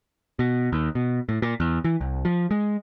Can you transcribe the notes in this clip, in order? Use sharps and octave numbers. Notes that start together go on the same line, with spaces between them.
B2
D#2
B2
A2
A#2
E2
E3
C2
F3
G#3